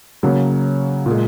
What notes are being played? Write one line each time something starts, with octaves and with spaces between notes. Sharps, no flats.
C#3 F#3 A#3
A#2 G#3